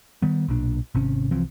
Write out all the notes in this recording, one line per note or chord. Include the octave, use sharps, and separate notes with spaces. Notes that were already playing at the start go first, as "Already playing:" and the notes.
D#3 G3 B3
B1 A#2 D4
G#1 C3 C#4
C2 E3 F3 C4